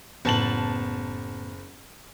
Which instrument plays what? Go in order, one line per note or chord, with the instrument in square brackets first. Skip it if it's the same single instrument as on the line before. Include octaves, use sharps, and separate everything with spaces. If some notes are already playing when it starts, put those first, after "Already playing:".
[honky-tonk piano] F#1 A5 F#7 [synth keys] A2 B3